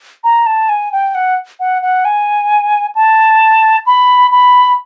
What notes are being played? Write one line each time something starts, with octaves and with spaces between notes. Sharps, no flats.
A#5
A5
G#5
G5
F#5
F#5
F#5
G#5
A5
B5
B5